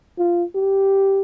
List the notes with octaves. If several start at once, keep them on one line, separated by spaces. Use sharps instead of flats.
F4
G4